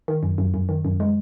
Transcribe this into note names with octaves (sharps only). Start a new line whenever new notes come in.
D#3
F#2
F#2
F#2
D#3
F#2
G#3